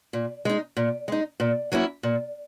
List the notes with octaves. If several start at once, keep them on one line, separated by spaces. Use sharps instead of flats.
A#2
G#3 D#4
A#2
G#3 D#4
A#2
F#3 A#3 C#4 E4
A#2